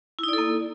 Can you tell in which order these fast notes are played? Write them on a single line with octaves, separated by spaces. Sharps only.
E4 D#4 D5 A4 A#3